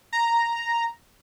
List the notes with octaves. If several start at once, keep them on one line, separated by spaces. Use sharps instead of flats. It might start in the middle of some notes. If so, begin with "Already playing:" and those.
A#5